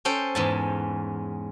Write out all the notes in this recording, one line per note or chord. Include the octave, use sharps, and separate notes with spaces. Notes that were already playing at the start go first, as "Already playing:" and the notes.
C#4 A4 C5 G5
E2 G#2 A5